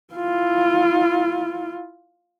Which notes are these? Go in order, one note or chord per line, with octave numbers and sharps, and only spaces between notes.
E4 F4